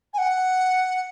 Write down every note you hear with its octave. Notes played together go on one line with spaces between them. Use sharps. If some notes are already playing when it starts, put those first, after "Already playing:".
G#5
F#5